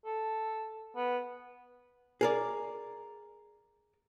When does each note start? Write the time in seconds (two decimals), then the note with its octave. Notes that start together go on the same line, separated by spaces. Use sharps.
0.05 A4
0.96 B3
2.21 G#4 A#4 D5